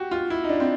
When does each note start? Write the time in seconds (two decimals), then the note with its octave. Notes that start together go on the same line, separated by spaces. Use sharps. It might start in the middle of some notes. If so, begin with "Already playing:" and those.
Already playing: F#4 G4
0.11 F4
0.30 E4
0.44 D#4
0.49 D4
0.60 C4